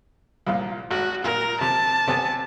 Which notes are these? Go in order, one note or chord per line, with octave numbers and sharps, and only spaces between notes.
C2 A#2 F4
G#1 F#4
A#2 A#4
C3 A5
C3 B3 G#5